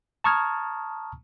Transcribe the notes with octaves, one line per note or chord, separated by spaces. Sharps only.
A5 A#5 C#6 D#6 F6 G#6